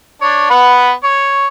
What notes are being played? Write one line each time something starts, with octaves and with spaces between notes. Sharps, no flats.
D4 C#5
B3 B4 F#5
C#5